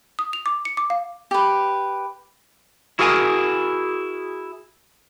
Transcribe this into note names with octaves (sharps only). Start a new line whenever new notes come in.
D#6
F7
D6
C#7
D6
F5
G4 B4
E4 F#4 G#4 A#4 E5 G#5